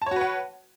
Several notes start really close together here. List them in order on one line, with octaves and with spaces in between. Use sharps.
A5 C#5 F#4 B4 F#5